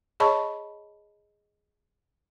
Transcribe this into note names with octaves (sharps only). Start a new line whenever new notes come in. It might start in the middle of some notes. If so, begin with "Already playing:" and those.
G#4 C#5 D#5 A5 B5 C#6